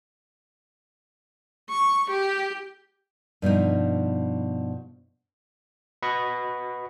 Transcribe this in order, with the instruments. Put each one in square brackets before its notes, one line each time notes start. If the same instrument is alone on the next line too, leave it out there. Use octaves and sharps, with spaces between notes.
[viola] C#6
G4
[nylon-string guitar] G2 B2 F3 D#4
[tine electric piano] F#4 B4 D#5 B5 C#6